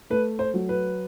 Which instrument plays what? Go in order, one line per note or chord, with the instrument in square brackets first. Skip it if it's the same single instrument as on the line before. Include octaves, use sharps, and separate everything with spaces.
[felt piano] A3 [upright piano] B4
[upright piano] C5
[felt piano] F#3
[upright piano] B4